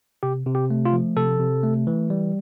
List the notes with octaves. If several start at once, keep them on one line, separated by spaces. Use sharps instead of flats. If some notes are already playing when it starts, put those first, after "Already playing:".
C3 G4
C3
G4
A3
F4
F3
C3 A4
C3
A3
E3
G3